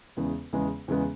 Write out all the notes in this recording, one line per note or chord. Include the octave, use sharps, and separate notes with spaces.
E2 C#3 G#3 B3
E2 C#3 G#3 B3
E2 C#3 G#3 B3